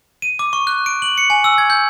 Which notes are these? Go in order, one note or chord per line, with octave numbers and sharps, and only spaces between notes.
D#7
D6
C#6
F#6
D7
F#7
C#7
G#5
E6
G#6
G6